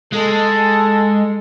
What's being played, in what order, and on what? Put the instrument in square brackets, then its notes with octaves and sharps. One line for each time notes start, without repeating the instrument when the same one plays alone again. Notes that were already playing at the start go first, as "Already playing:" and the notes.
[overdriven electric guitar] G#3 [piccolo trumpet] A4